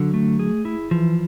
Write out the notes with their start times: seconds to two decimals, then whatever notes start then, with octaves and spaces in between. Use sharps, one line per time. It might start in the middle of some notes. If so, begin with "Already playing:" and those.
Already playing: D3 F#3
0.14 A3
0.39 G#4
0.65 E4
0.91 E3 F3